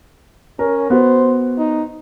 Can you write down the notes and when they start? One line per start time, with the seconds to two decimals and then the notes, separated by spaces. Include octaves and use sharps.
0.59 C#4 A#4
0.90 B3 F#4 C5
1.58 D#4